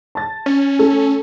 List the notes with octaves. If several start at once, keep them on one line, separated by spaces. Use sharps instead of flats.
A5 A6
C#4
A3 A4